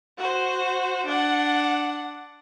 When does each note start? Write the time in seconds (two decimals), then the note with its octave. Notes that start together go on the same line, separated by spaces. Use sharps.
0.18 F#4 C5
1.06 D4 F#5